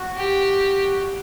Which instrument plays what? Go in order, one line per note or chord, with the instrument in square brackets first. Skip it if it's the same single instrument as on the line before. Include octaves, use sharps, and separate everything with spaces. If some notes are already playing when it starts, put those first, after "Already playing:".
Already playing: [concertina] F#4
[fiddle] G4